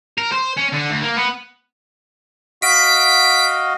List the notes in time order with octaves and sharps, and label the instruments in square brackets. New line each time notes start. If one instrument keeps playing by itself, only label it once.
[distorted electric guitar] A#4
C5
C#4
D3
D2
A#3
B3
[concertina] F#4 D#5 F5 [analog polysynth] B6 D7